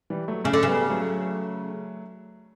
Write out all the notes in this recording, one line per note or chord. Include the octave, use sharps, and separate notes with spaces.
E3 G3
F#3 A3
C#3 A3 C#4
D3
C#3 G3 B3
F#3 A3